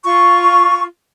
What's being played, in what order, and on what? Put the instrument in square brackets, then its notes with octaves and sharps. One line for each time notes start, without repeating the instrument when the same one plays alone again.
[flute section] F4 C#6